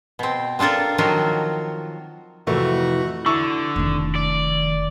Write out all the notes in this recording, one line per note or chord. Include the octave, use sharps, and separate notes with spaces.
B2 C4
C4 D4 F4 A4 A#4
D#3 F3 F#3 F4 F#4 A#4
F2 C3 E3 A3 F#4
D3 E4 C#6 E6
F1 D#3
D5